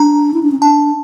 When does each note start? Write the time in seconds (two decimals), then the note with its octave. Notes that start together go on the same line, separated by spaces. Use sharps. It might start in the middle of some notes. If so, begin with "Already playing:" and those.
Already playing: D4 A#5
0.34 E4
0.43 D4
0.51 C#4
0.59 D4 A5